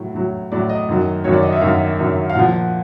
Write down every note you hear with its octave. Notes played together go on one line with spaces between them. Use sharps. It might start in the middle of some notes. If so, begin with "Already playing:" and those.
Already playing: A2 F#3
A2 F#3
A2 F#3 D5
D#5
F#2 D#3 F#3
F#2 D#3 F#3 C#5
D5
D#5
E5
F#2 D#3 F#3 F5
F#2 D#3 F#3
F5
A#2 F3 F#5